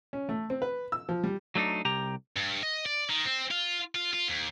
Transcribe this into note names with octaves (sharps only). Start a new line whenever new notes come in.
C#4
A3
C4
B4
E6
F3
G3
F#3 A3 D4 D#4
C2 G4 A#5
G2
D#5
D5
D#3
C4
F4
F4
F4
D#2